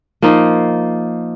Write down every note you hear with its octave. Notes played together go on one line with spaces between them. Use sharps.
F3 A#3 D#4